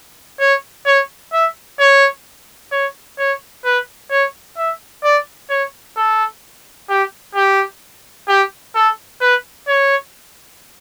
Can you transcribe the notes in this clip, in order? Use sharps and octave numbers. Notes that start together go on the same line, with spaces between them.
C#5
C#5
E5
C#5
C#5
C#5
B4
C#5
E5
D5
C#5
A4
G4
G4
G4
A4
B4
C#5